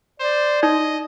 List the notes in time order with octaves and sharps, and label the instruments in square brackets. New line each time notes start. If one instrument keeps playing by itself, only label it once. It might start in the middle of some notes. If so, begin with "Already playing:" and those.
[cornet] C5 [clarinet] D5
[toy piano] D#4 [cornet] D#5